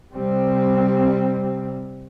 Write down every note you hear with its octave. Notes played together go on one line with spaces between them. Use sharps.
C3 G3 C4